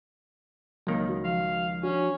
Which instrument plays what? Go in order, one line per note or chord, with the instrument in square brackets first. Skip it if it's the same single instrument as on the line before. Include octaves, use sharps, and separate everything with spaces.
[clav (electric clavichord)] C#2 D#3 [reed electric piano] F#3 A#3
[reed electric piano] F#4
[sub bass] F3 [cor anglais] F5
[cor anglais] C#4 [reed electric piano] D4 F#4